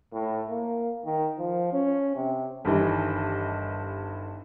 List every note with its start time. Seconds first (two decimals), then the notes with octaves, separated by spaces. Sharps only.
0.12 A2
0.49 A#3
1.04 D#3
1.38 F3
1.73 C#4
2.15 C3
2.65 G1 G2 D#3 E3